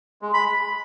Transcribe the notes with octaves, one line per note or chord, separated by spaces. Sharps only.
G#3
B5